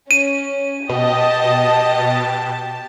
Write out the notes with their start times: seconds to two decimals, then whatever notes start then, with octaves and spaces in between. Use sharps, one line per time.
0.11 C#4 D#7
0.89 B2 G4 D#5 A5